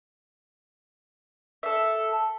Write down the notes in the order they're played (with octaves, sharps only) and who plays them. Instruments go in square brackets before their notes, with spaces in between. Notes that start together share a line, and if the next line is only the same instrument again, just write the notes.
[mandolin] A4 E5